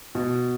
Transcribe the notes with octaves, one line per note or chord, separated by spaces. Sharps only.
B2